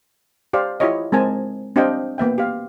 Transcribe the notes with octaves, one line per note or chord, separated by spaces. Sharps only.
G4 C5 D5 F5
E4 F4 G4 C#5 D#5
G#3 C4 A#4 G#5 A5
C4 D4 G4 D#5 F5 G5
A#3 B3 E5 G5
G4 F5